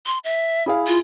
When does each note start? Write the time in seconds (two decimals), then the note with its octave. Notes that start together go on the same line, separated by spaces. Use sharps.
0.06 C6
0.24 E5
0.66 E4 G#4 F5
0.87 F4